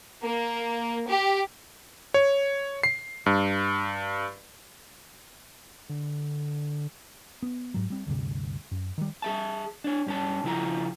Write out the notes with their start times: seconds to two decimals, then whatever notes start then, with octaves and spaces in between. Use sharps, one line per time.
0.22 A#3
1.08 G4
2.14 C#5
2.83 C7
3.26 G2
5.89 D3
7.42 B3
7.74 G#2 F#3
7.90 G3 C4
8.07 D2 G2 C3
8.71 F#2
8.98 D#3 G3
9.22 G#4 E5 A5
9.84 D4 C#5
10.07 G2 C#4 A5
10.44 C#3 F3 E4 F4 A#5